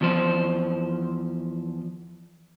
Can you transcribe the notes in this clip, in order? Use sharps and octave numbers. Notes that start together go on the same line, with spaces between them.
E2 F3 C5